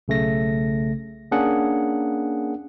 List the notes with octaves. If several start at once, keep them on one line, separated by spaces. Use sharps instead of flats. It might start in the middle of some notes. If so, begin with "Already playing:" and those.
B1 C#3 A3 A#6
A#3 C#4 D4 G#4 F#5